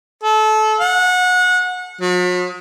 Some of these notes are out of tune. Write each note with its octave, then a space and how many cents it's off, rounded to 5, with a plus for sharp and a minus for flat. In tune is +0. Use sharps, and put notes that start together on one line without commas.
A4 -25
F#5 -25
F#3 -45